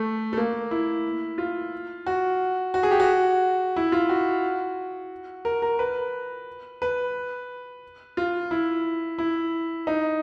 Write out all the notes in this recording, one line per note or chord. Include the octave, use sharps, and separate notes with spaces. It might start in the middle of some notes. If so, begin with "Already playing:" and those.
Already playing: A3
A3
A#3
E4
F4
F#4
F#4
G#4
G4
F#4
E4
F4
F#4
A#4
A#4
B4
B4
F4
E4
E4
D#4